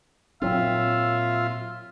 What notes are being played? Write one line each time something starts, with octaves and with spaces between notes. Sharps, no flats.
A#2 F#3 C4 F4 E5